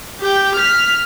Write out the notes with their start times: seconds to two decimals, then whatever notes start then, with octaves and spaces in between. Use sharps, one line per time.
0.20 G4 G5
0.55 F6 B6